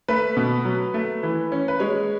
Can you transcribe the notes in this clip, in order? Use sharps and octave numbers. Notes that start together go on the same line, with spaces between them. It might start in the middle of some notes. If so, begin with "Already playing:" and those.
A3 B4
B2
F#3
A3
E3
C#4
B4
G#3 C#5